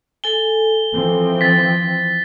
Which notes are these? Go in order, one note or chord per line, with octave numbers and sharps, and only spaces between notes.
A4 G#5 G7
E3 F3 C4
A6 B6